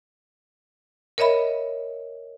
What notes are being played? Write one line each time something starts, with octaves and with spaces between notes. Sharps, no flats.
A#4 C#5 D#5 E5 B5